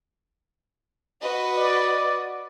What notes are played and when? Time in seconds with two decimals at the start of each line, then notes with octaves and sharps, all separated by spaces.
1.21 F#4 B4 D#5
1.56 D5